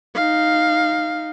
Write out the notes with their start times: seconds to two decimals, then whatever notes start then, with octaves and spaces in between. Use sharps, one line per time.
0.15 D#4 F5